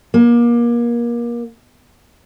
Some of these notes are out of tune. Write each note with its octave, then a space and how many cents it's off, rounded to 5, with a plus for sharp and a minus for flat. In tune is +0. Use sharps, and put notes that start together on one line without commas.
A#3 +30